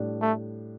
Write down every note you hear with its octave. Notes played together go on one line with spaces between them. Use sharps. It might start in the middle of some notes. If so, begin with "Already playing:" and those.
Already playing: A2 G3 D4
A3